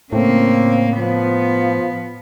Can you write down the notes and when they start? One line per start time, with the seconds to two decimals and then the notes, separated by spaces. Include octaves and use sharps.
0.13 A2 C#3 A#3 C4
0.98 F3 B3